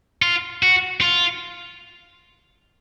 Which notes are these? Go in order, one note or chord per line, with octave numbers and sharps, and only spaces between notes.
F4
F#4
F4